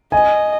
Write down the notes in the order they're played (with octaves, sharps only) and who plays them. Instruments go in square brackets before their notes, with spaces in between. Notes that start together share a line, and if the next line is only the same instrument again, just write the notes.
[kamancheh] D#5 [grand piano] G#5